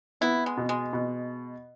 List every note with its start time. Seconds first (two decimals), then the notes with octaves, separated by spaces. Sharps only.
0.21 B3 E4
0.46 G#3
0.57 B2
0.69 G#3
0.93 B2